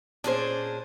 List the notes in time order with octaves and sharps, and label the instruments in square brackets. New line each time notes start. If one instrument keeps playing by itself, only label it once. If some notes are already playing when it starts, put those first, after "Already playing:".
[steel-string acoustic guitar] A#2 C#4 G#4 [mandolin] D4 C5